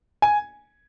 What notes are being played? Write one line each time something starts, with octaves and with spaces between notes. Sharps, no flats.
G#5